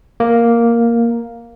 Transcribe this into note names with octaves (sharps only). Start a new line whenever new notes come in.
A#3